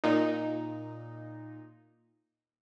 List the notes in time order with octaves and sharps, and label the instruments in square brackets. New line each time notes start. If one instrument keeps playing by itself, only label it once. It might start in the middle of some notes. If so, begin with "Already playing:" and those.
[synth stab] A#2 D#4